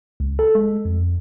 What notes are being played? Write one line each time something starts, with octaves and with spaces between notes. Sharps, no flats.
C#2
A4
G#3
F2